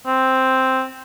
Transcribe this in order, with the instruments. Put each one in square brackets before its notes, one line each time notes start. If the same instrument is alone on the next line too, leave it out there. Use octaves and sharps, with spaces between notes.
[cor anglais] C4